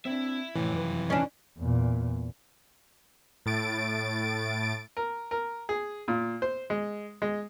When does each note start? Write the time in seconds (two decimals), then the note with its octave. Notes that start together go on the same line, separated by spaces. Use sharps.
0.05 C4 D4 E4 E5
0.56 F2 A2 C3 E3 C#4
0.73 F#2 B4
1.10 C#4 D4
1.59 E2 A#2
3.46 A2 A6 D7
4.97 A#4
5.31 A#4
5.69 G#4
6.08 A#2
6.42 C5
6.70 G#3
7.22 G#3